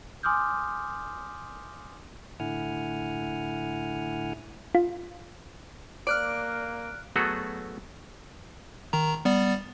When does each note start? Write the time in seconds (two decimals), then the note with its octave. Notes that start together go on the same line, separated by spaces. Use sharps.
0.23 G#5 C6 D6 D#6 F6 G6
2.40 A2 D3 E4 F#5 G#5 F6
4.75 F4
6.07 A#3 D5 F6 F#6 D7
7.16 F#3 A3 B3 F#4 G#4 A4
8.93 D#3 A#5
9.25 G3 B3 D5